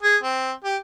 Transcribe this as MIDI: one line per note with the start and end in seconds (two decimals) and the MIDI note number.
0.03 0.17 68
0.23 0.52 60
0.65 0.77 67